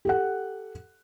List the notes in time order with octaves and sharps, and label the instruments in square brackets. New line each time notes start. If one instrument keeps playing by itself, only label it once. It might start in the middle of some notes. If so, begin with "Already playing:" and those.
[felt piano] G4 A4 F#5